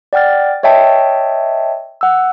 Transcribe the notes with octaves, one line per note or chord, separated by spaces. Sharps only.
D5 F#5 G5 F6 A6
C#5 D#5 E5 G5 A5
F#5 E6